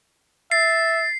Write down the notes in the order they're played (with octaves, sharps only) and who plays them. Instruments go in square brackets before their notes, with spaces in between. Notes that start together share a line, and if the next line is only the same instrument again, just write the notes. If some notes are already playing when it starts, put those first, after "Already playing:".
[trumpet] E5 [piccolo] A6 [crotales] C7